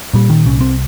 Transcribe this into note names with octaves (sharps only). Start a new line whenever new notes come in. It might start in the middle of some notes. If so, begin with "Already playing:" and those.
A#2 G3
D#3
C2 C#4
C4